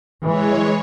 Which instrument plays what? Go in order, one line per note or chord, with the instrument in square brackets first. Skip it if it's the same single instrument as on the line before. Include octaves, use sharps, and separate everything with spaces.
[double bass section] E3 [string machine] G#3 C#5